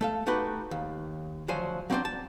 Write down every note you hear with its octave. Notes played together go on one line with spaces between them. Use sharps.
A3 A4 F5
A3 D#4 F#4 G4 B4
D#2
D2 F3 F#3 C5 G#5
F#3 C4 D4 F#4 C5 D5
A5